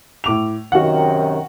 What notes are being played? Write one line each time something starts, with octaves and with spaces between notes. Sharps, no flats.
A2 D6 F7
F#2 C3 D#3 F#4 F5 F#5